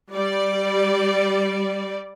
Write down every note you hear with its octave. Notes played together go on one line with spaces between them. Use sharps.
G3 D5